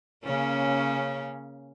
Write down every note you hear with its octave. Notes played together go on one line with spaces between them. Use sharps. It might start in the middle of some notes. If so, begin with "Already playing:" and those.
C#3 A#3 C#4